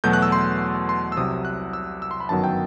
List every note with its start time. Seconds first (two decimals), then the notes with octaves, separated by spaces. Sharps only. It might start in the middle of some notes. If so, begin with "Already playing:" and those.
0.04 E2 B2 F#3 A3 G6
0.13 F#6
0.22 E6
0.32 C6
0.89 C6
1.12 E6
1.17 C2 C3 F#3 D#6
1.45 F#6
1.73 E6
2.02 E6
2.11 C6
2.20 B5
2.29 G1 F#2 D#3 F#3 B3 A5
2.44 G5